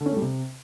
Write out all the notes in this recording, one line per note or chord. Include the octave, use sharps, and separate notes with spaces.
D3
C#4
A3
G3
C3